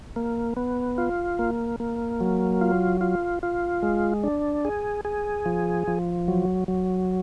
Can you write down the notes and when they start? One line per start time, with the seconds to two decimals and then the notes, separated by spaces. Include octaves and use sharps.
0.16 A#3
0.57 B3
0.98 F4
1.39 A#3
1.80 A#3
2.21 F#3
2.61 F4
3.01 F4
3.43 F4
3.83 G#3
4.23 D4
4.65 G#4
5.05 G#4
5.46 F3
5.87 F3
6.28 F#3
6.68 F#3